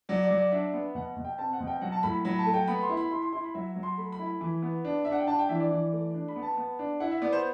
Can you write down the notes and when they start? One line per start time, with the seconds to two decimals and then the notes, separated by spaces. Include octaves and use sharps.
0.09 F#3 D5
0.23 D5
0.30 F#3
0.38 D5
0.52 D4 E5
0.73 B3
0.95 B2 F#5
1.17 B2
1.24 G5
1.38 C4 A5
1.53 F#5
1.60 B2
1.67 G5
1.81 F#3 F#5
1.92 A5
2.03 A2 B5
2.14 B5
2.25 F#3 B5
2.39 A5
2.46 A3
2.54 G5
2.68 B3 B5
2.82 C6
2.89 E4
2.97 B5
3.11 E4 C6
3.22 C6
3.33 E4 C6
3.44 B5
3.54 F#3 E5
3.76 F#3
3.83 C6
3.98 A3 B5
4.12 B5
4.19 E4
4.26 B5
4.41 E3
4.62 B3
4.85 D4
5.05 D4 E5
5.12 F#5
5.20 G5
5.27 D4 A5
5.39 G5
5.49 E3 E5
5.60 D5
5.71 E3
5.92 A3
6.14 D4
6.28 B5
6.36 B3
6.43 A5
6.57 B3
6.79 D4
7.00 E4 F#5
7.11 E5
7.22 B3 D5
7.32 C5